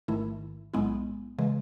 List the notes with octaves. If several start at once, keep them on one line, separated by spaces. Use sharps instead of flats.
A1 G#2 D#3 A3 E4
B1 A2 G#3 B3 E4
C#3 E3 G#3